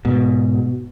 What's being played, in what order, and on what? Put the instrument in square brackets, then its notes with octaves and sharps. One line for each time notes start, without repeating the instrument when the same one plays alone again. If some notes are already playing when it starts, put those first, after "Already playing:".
[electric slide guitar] G#2 [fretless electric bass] B2